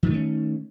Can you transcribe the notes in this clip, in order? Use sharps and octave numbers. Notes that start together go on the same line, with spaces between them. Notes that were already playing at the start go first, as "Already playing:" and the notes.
D#3 F#3 A3 C#4